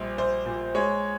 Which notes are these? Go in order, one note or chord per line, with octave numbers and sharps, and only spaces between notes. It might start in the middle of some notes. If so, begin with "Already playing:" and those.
Already playing: A#1 G3 C5
A#1 C5
A#2
G#3 C#5